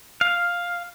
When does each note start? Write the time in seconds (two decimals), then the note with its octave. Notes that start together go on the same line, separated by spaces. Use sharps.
0.21 F5